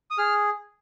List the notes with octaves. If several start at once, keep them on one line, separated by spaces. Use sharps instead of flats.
D#6
G#4 F6